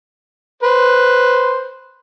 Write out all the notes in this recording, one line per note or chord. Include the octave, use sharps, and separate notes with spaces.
B4 C5